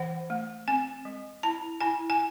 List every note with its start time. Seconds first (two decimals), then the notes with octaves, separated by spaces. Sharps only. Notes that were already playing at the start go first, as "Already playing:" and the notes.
Already playing: E3 F#5
0.30 A3
0.68 C4 G#5
1.05 G#3
1.43 E4 A5
1.81 E4 G#5
2.10 G#5